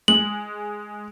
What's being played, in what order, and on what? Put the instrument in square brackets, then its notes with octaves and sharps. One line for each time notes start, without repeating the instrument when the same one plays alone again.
[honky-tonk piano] G#3 [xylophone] F#7